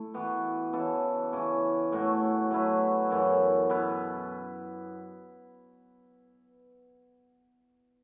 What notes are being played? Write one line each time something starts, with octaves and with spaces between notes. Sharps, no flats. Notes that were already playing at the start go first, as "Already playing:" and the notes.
Already playing: A3 E4
E3 B3 F#4 B4
C#3 E3 B3 A4
C#3 E3 C#4
A2 A3 F#4
F#3 A3 E4 B4
F#2 C#3 E3 B3
B2 B3 E4 B4